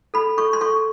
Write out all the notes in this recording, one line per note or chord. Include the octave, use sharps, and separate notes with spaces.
A4 B5
A4 C#6
C6
A4 C#6